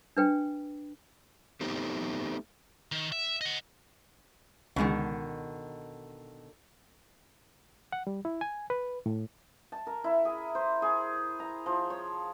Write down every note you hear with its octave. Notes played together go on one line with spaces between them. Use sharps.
D4 B4 G5
A3 B3 C4 D#4 G4
D#3
E5
D#5 F#5
C#2 B2 D3 D#3 G#3
F#5
G3
E4
G#5
B4
A2
A5
A#4
E4
G#4
C5
G#4
A#5
F3
C#5